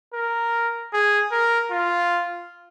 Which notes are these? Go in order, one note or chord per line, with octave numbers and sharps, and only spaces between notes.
A#4
G#4
A#4
F4